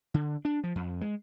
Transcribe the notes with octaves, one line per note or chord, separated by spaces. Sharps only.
D3
D4
F3
F2
G#3